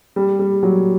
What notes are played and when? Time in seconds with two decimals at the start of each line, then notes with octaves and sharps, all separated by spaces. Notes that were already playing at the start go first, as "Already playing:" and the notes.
0.16 G3
0.39 G3
0.63 F#3